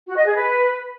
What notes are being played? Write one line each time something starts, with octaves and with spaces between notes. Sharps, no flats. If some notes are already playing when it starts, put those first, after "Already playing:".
F#4
D#5
G#4
B4